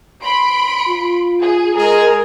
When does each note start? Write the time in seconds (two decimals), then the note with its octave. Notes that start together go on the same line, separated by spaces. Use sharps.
0.22 B5 C6 D7
0.89 F4
1.40 G#4
1.76 G#3 G#4 A#4